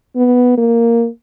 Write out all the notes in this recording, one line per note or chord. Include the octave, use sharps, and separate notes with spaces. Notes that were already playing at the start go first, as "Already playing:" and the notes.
B3
A#3